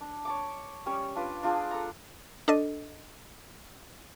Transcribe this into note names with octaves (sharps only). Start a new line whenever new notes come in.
D4
C#5 A5 D6
G3 C#4 C#5
D4 F4 B4 D5
D4 F4 G#4
A4 A#5
D4 A4 D#5